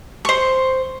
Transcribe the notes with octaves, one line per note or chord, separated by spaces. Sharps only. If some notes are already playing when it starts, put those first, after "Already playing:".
C5 C#6